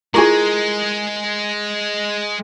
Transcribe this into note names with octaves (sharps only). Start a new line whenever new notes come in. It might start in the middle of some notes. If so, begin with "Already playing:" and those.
G#3 E4 F4 G#4 A#4 C#6